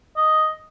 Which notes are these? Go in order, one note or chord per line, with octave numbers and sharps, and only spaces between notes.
D#5